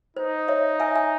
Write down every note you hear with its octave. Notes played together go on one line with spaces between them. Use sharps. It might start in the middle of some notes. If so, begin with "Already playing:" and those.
D#4 C5
C#5 E5
E5 G#5
E5 G#5